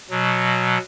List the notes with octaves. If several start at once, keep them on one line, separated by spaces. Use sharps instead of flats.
B2 F#3